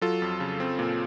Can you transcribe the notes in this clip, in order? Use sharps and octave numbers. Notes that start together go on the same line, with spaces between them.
F#3 F4 A4
F2
C#3
C4
A#2